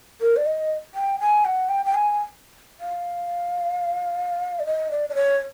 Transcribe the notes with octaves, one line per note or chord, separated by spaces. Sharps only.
A#4
D5
D#5
G5
G#5
F#5
G5
G5
G#5
F5
D5
D#5
D5
D5
C#5